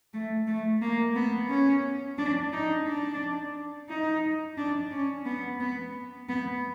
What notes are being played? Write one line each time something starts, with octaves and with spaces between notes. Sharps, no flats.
A3
A3
A#3
B3
C#4
D4
D#4
D4
D#4
D4
C#4
B3
B3
B3